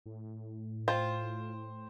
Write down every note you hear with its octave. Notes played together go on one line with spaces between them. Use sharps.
A2
F4 C5 G5